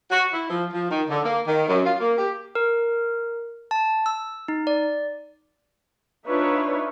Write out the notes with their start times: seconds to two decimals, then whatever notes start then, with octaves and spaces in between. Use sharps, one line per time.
0.11 F#4
0.33 E4
0.50 F3
0.73 F3
0.90 D#3
1.10 D3
1.25 A#3
1.47 D#3
1.68 F#2
1.85 F4
2.00 A#3
2.18 G4
2.55 A#4
3.71 A5
4.06 E6
4.48 D#4
4.67 D5
6.26 D4 D#4 F4 B4 C#5 E5